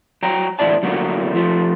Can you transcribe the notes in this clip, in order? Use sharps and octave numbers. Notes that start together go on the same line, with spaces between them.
F#3 G5 A#5
E2 A2 D3 E4 D5 A5
D3 F#3 A3 A#3
F3 A3